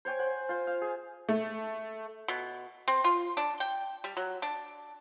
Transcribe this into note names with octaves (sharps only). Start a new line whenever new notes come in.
C5 C#5 G5 G#5
C5 F#5
F4 C5
F5
G#4
A3
B2
C4
F4
D4
G5
G3
F#3
D4